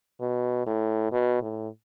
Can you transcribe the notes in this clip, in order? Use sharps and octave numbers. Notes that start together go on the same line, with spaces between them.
B2
A2
B2
A2